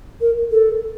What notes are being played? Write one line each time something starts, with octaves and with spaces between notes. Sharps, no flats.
A#4
A4